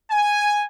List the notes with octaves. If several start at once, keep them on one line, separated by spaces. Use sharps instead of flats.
G#5